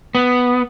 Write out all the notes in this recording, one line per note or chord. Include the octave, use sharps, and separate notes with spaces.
B3